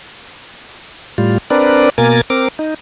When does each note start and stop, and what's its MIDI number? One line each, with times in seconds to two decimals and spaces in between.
1.18 1.38 45
1.18 1.38 55
1.18 1.38 65
1.50 1.90 60
1.50 1.90 62
1.50 1.90 70
1.50 1.90 71
1.50 1.90 74
1.98 2.21 47
1.98 2.21 58
1.98 2.21 70
1.98 2.21 80
1.98 2.21 93
2.30 2.48 60
2.30 2.48 70
2.30 2.48 86
2.59 2.74 63